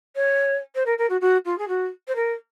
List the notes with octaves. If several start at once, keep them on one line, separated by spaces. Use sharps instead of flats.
C#5
C5
A#4
A#4
F#4
F#4
F4
G#4
F#4
C5
A#4